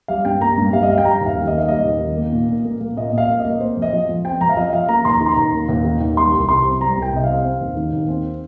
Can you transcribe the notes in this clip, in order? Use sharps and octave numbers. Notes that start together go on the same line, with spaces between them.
G3 F5
G2 G5
A#3 A#5
G2
G3 F5
D#5
G2 F5
G5
G3 A#5
D#2 F5
D#3
D#5
A#3
F5
G3 D#5
D#2
D#3
A#3
A#2
A#2
A#3
A#3
A#2 D#5
A#2 F5
A#3
A#3 D#5
C4 C5
F2
D#5
F3
F2
C4 G5
F2 A#5
F5
F3 D#5
F2 F5
A#3 A#5
D#2 A#5 C6
D#3
C6
A#5
D#2
A#3
D#2
D#3
D#2
G3 C6
C2
C3 C6
C4
G3 A#5
C2 G5
C3 D#5
C4 F5
C4
D#2
D#3
D#2
C4